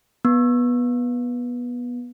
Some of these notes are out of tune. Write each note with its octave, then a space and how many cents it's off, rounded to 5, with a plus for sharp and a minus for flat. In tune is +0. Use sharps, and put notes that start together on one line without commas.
B3 -15